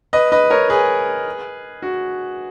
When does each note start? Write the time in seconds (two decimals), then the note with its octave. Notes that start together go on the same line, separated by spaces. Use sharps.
0.13 B4 D#5
0.32 B4 D#5
0.50 A#4 C#5
0.70 G#4 B4
1.82 F#4